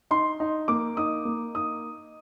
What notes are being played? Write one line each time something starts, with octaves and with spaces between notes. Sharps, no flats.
D#4 C6
D#4
A#3 D6
D#4 D#6
A#3
D#4 D#6